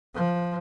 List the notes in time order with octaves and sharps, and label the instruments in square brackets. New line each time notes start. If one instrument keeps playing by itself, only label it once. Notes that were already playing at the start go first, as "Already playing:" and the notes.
[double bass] F3